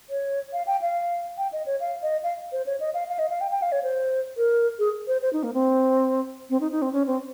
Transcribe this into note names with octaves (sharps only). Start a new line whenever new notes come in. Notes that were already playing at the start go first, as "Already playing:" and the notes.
C#5
F5
G5
F5
G5
D#5
C#5
F5
D#5
F5
C5
C#5
D#5
F5
F5
D#5
F5
G5
G5
F5
C#5
C5
A#4
G#4
C5
C5
D#4
A#3
C4
C4
D#4
D#4
C4
C#4
C4